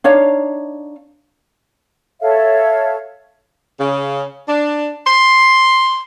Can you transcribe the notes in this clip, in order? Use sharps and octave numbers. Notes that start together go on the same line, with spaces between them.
D4 D#4 C#5 F5
A4 C#5 E5 F5
C#3
D4
C6